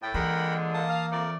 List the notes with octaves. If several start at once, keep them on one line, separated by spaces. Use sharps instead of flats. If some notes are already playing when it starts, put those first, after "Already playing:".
A2 G5
A#2 D3 E3 G#3 A#4 F#5 B5
A#3 A5 D#6
F5
F2 A3 A#4 D5